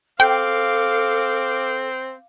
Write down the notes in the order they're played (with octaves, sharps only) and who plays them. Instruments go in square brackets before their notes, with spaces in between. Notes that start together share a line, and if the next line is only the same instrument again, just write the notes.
[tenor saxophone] C4 [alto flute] A4 [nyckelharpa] F5 D6 [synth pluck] G5